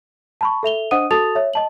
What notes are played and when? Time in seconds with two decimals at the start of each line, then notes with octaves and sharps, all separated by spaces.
0.41 A5 B5 C#6
0.63 A4 E5 F7 G7
0.91 D4 C5 D#5 F#5 D#6 D#7
1.11 F#4 A4 A5 D#6 A6 F7
1.35 C#5 E5
1.53 D#5 A5 F#7